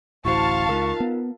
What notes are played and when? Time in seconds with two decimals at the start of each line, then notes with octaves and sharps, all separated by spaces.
0.25 D1 A1 E4 F#4 C5 F5 A5 C#6
0.69 C#2 D#4 F4 A#4
1.00 B3